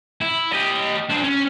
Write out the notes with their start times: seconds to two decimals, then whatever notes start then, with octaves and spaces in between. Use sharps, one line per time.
0.21 E4
0.52 G4 D#5
1.09 D4 C5
1.24 C#4